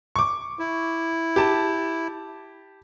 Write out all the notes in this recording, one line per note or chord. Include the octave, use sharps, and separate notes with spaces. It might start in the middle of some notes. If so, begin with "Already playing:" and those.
C#6 D6
E4
G4 A5